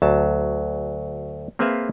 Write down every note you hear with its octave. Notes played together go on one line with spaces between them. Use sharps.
D2 F#3 A5
A#3 C4 G#4 B4 E5 F5